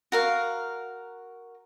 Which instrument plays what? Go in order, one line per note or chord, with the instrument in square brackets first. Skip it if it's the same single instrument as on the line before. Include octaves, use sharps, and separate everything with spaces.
[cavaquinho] F#4 A#4 F5